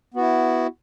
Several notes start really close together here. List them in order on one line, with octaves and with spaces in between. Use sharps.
B3 F#4 E4